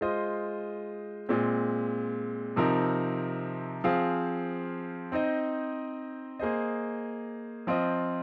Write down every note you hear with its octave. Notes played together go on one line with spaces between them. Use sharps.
G#3 F4 C5 D#5
A#2 G#3 C4
C3 F3 C4 D#4 A#4
F3 C4 G#4 F5
C4 D#4 C5 D#5
A#3 G#4 C5 D#5
F3 C4 F4 C5 D#5